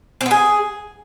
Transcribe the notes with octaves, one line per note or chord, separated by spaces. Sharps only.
C4
B3
G#4